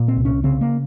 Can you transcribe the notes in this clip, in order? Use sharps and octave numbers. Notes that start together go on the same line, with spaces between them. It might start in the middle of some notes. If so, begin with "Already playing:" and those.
Already playing: A#2
C4
C2
C#4
C#3 C4
A#3